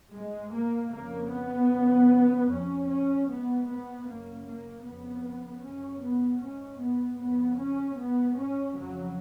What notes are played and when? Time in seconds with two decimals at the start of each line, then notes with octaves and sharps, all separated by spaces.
0.13 G#2 G#3
0.52 A#3
0.91 F2 C#3 A#3
1.31 B3
1.70 F2 C#3
2.48 F2 C#3 C#4
2.87 C#4
3.26 G#2 B3
3.65 B3
4.04 F#2 C#3 A#3
4.43 A#3
4.82 F2 C#3 B3
5.61 F#2 C#3 C#4
6.00 B3
6.39 G#2 C#4
6.78 B3
7.18 F2 C#3 B3
7.56 C#4
7.96 G#2 B3
8.35 C#4
8.74 F2 C#3 F#3